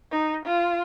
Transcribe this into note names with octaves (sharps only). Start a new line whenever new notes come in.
D#4
F4